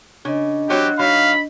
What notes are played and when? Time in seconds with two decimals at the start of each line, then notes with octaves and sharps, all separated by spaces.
0.25 C#3 D4 D#5
0.70 E3 F#3 C4 G4
0.99 F#3 D#4 F5 B5